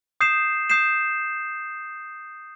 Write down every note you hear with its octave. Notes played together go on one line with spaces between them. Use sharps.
D#6 G6 C7 E7
D#6 G6 C7 E7